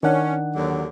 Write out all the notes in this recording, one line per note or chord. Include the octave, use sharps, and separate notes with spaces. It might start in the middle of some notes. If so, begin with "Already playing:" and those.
D#3 C#4 D4 F#5
D#2 D3 F#3